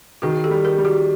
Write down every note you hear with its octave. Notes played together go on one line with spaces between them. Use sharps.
D#3 F#4 G#4
G4 A4
G3
G#4 A#4
G3
F#4 G#4